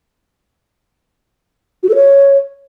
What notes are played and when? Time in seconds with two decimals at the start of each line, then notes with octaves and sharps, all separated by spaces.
1.83 F#4
1.89 A4
1.95 C#5